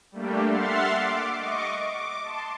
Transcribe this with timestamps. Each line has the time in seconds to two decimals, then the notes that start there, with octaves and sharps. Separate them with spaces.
0.12 G3 A3 A#3 D4 G4
0.45 E5 F#5 C6 F6 A6 C7
0.90 D6
1.35 D#5 C#6 D6
1.83 D6
2.23 A5 C6